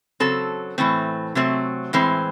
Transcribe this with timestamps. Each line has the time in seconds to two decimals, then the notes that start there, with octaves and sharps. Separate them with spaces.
0.20 C#3 F#3 C4 A4
0.78 A2 E3 A3 C4
1.35 C3 F#3 A3 C4
1.93 A2 E3 G#3 C4